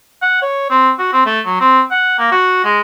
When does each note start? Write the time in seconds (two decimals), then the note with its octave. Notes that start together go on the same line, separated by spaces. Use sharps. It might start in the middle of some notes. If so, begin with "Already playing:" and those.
0.22 F#5
0.42 C#5
0.70 C4
0.99 F#4
1.13 C4
1.26 A3
1.45 F#3
1.60 C4
1.91 F#5
2.18 A#3
2.31 F#4
2.64 G#3